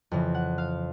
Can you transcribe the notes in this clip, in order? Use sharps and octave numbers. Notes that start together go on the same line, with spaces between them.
F2 C#3 E3
F#5
F5